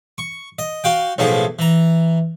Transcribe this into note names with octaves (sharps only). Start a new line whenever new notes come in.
C#6
D#5
F#4 F5 G5
B1 A2 F3 A#3 G#4
E3 A#5